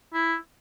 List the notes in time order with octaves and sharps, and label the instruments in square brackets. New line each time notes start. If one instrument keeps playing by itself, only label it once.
[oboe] E4